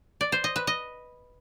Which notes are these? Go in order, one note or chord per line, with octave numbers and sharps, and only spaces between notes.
D5
C5
D#5
B4
D#5